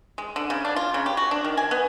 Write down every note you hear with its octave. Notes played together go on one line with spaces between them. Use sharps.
G#3
D3
C#3
D4
F4
C#3
G4
F#4
D4
D#3
G#5
B3